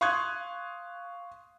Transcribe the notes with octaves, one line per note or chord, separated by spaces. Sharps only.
F5 C6 C#6 D#6 F#6 G#6